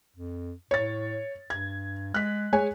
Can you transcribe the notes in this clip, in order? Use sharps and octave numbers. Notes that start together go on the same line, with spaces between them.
F2
A2 C#5 A6
G2 G#6
G#3 F#6 B6
G#3 C#5 G#5